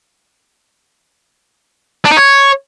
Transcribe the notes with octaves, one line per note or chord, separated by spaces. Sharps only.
D4
D#4
C#5